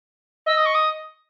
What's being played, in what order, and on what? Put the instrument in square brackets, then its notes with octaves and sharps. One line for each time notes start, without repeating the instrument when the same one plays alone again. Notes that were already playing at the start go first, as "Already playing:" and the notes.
[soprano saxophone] D#5 [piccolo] E6
[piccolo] D#6
C#6
D#6